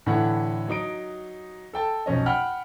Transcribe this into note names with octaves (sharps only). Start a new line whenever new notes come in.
A2 D3 E3 E4 F#5
F#3 D#4 D#6 D7
A4 G5 A5
B1 F2 C#4 D#5
F#5 G5 B5 F6